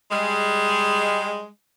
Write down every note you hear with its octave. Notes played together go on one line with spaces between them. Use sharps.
G3 G#3